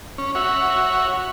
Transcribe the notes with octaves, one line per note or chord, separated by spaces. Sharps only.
C#4
F#4 C#5 E5